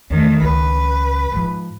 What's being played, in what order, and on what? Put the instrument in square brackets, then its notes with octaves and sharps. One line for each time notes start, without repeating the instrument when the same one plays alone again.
[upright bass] E2 [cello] D#3 A3
[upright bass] C#2 C#3 [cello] B4
[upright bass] G#2 F3